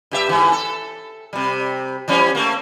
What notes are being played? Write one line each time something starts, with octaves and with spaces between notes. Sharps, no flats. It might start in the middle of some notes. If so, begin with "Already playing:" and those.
G2 G4 E5
G#2 E3
A4
C3 G3
E3 G3 C#4
A3 A#3